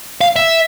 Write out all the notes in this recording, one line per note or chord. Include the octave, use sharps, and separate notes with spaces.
F5
E5